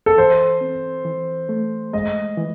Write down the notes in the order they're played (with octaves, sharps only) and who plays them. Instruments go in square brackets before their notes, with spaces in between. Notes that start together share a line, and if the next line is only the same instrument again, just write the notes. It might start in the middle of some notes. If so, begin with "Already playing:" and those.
[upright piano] A4
[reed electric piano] E3 [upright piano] C5
[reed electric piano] C4
E3
A3
[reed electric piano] G#3 [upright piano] D#5
[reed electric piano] E3